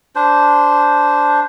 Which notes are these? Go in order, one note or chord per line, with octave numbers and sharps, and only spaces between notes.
D4 C5